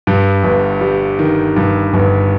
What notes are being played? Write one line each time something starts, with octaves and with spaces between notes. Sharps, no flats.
G2
G1
G3
D#3
G2
G1